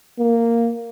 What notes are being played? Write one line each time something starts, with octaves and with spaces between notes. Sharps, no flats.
A#3